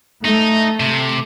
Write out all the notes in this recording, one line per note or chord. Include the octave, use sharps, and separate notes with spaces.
A3 D#4
C3